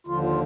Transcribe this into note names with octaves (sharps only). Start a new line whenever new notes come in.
D#2 D3 F3 F4
F4